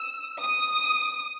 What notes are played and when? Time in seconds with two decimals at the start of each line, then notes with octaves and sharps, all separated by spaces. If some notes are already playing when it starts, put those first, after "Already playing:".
Already playing: E6
0.40 D#6